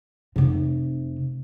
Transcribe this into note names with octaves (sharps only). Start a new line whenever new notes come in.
F1 C3